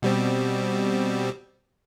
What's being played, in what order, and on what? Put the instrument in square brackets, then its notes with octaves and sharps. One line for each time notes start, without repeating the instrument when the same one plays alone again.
[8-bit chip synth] B2 G3 C4